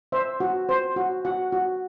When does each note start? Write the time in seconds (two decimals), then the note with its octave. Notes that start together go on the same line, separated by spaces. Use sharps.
0.12 C5 E5
0.40 F#4
0.69 C5
0.96 F#4
1.25 F#4 F#5
1.52 F#4